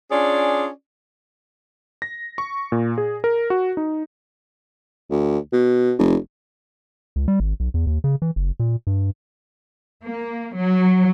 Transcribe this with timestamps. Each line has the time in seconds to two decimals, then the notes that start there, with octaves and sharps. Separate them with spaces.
0.11 C#4 D4 F4 G#4 D5
2.02 A#6
2.38 C#6
2.72 A#2
2.98 G#4
3.24 A#4
3.50 F#4
3.77 D#4
5.11 D2
5.53 B2
5.99 F1
7.16 C#2
7.28 G3
7.40 G#1
7.60 B1
7.74 E2
7.87 D#2
8.04 C#3
8.22 E3
8.36 F#1
8.60 A#2
8.87 G2
10.04 A#3
10.52 F#3